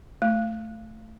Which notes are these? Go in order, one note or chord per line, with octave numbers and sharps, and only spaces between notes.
A3